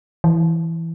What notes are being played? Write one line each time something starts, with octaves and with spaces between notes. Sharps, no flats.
E3